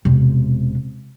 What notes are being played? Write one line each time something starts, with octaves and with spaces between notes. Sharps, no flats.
E1 C3